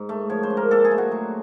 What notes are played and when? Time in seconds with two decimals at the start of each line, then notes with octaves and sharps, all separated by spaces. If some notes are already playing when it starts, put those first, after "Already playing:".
Already playing: G#2
0.09 A3
0.30 F3 C#5
0.43 C5
0.50 D4
0.57 A#4
0.71 A#2 A4
0.85 G#4
0.91 A3
0.98 F#4
1.11 F#3